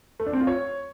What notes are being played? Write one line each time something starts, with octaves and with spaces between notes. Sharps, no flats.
A3
D4
C4
F4
C#5